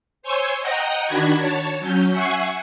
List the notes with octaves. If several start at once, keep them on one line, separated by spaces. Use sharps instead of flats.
C5 C#5 G#5 C6 C#6 E6
D#5 F#5 G5 A#5 D#6
D#3 D4 F#4 B5 G#6
C#5 A5
F#3 C#4 G6
E5 F#5 G#5 C#6 C7